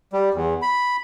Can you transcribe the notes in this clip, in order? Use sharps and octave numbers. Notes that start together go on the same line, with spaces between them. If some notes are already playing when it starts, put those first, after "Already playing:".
G3
E2
B5